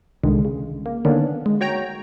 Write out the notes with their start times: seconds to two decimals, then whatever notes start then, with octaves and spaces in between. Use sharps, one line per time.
0.23 C2 D3 D#3 G#3
0.45 C#3
0.86 A#3
1.05 D3 D#3 A#3 B3 C#4 D4
1.46 G#3
1.61 F#4 C#5 G5 A#5